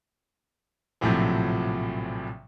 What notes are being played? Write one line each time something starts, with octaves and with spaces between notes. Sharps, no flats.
A#1 A2 C3 F3 F#3